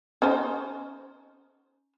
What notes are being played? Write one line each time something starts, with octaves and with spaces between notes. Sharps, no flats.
C#4 D#4 C5